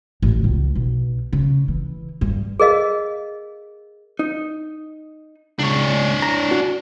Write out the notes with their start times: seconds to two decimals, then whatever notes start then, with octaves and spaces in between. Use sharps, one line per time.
0.22 A1
0.44 C#2
0.75 B1
1.33 C#3
1.68 E3
2.21 G2
2.60 G#4 A#4 D#5 F5
4.19 D#4
5.59 C#2 D4 C#5
6.22 A#5
6.51 F#4